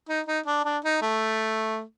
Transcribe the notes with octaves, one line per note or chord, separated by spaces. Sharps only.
D#4
D#4
D4
D4
D#4
A3